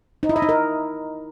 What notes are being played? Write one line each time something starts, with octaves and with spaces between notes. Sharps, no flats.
D#4
E4
D#5
D#4
A#4